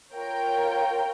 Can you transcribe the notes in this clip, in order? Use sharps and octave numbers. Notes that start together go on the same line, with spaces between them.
F4 A#4 C#5 G5